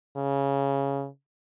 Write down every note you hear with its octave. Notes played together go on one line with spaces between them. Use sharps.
C#3